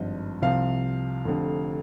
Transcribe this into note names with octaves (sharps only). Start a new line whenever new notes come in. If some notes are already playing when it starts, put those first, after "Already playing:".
Already playing: G#1 G2 F3 D#5
C2 C3 F3 F5
F1 F2 D3